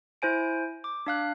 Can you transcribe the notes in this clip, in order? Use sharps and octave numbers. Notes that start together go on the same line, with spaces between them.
E4 C5 G#5 D7
D6
D4 F5 F#6